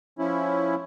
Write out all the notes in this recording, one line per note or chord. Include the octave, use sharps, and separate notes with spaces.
F3 C#4 E4